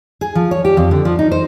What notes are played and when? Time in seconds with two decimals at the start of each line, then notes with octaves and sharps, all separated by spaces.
0.21 G#4
0.35 F3
0.51 C#5
0.65 G4
0.77 F2
0.91 D3
1.05 F3
1.19 D#4
1.32 C5